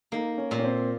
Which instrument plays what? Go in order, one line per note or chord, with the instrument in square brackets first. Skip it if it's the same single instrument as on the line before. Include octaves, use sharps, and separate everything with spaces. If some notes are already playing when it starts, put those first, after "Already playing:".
[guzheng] A#3 [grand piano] D#4
[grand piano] C#4
[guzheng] A#2
[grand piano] C#4
C4